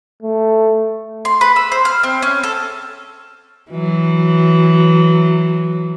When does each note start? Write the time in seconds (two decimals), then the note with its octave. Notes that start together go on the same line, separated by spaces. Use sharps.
0.22 A3
1.25 C6
1.41 B4
1.56 E6
1.72 C5
1.85 F6
2.03 C4
2.22 C#4
2.43 A4
3.71 E3 F#3